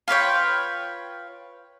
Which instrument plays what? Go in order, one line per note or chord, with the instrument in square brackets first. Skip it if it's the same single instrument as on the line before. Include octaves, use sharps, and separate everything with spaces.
[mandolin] F4 B4 C#5 G5